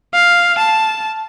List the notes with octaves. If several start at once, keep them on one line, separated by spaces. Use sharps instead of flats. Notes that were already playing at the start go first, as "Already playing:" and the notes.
F5
A5